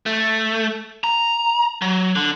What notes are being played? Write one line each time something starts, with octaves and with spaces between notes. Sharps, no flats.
A3
A#5
F#3
D3